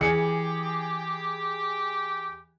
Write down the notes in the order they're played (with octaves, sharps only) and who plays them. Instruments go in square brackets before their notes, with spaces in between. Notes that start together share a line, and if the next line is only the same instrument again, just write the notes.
[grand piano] E3 G#4 C#7 [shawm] G4